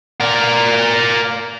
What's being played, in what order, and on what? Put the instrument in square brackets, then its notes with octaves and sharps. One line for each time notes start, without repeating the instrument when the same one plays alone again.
[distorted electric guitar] A#4 D5